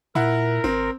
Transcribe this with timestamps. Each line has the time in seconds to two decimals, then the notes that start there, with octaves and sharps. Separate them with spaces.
0.15 A#2 E4 A#4 F#5
0.64 G#1 C4